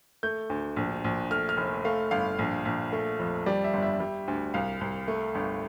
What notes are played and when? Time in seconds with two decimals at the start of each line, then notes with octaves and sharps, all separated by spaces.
0.23 A3 G6
0.50 D2
0.76 A#1
1.04 A#1
1.31 A3 F6
1.49 F6
1.57 F1
1.85 A3 F5
2.11 G1 F5
2.39 A#1
2.65 A#1
2.92 A3
3.19 F2
3.46 G3 D5
3.64 E5
3.73 G1
3.82 E5
4.00 G3
4.28 D2
4.54 C2 F5
4.81 C2
5.08 A3
5.35 G1